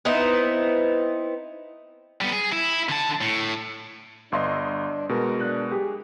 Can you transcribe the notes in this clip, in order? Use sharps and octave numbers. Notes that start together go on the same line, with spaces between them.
B3 C4 D#4 E4
G3 B3
G#4
E4
D3 A5
A2
G1 D4 D#5 C6 E6
B2 G#3 A#4
D4 F#6
G4 G#4